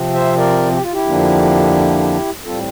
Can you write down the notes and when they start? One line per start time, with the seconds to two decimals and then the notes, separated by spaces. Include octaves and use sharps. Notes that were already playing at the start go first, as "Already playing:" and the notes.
Already playing: C3 F3 C4
0.13 C5 E5
0.37 A#4 D5
0.72 G4
0.82 F4
0.92 E4 G4
1.06 F2 D3 F3 A#3 D4
2.44 A2 G3 C4 F4 A4